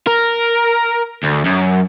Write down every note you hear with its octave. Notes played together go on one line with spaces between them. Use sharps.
A#4
D2
F#2